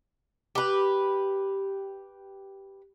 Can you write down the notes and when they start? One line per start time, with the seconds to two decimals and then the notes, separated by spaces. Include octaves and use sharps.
0.55 G4 B4